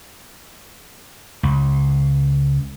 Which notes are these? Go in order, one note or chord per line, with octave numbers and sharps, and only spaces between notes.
C#2